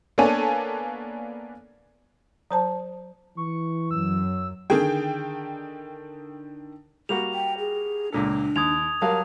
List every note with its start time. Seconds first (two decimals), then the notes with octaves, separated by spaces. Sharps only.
0.18 A#3 B3 D4 A4 C#5 G#5
2.51 F#3 C5 A5 A#5
3.37 E3 C#6
3.91 F#2 F#3 E6
4.70 D3 D#3 G#4 G5
7.09 G3 A#3 F#4 F7
7.34 G5
7.58 G#4
8.12 C#2 A#2 D4 A4
8.56 D#2 D#6 G#6 F7
9.02 F#3 G3 A#4 F5 A5